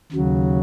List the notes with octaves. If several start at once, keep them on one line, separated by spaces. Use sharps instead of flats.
D#2 C#3 F#3